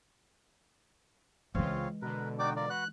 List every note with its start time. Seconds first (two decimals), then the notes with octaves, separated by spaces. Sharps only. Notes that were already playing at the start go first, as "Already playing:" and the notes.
1.55 C#2 C#3 E3 G#3 C4 F4 C#5 F5
2.02 B2 D3 A#4 B4
2.39 D#4 F#4 D5 G5 D6
2.56 F4 A#4 D5
2.70 F#4 B4 F#5 F#6